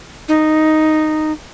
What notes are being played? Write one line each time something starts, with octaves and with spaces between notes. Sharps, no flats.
D#4